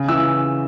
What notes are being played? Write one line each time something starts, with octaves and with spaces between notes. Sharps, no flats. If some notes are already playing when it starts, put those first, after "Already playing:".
Already playing: C#3
E3 E6